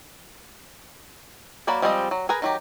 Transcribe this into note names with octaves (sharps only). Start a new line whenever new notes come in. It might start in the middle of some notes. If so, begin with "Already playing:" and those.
F#3 A#3 F#4 D5 B5
F3 G3 G#3 C4 D#5
F#3
G#4 A#4 B4 G#5 A#5
D#3 F#3 G4